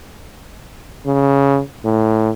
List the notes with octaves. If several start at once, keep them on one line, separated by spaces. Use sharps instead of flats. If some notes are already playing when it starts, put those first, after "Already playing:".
C#3
A2